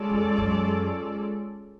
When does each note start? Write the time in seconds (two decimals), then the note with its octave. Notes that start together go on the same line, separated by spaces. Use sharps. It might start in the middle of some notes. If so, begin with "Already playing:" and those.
Already playing: G#3 C#4 F4 A4 D5
0.10 F2
0.38 F#2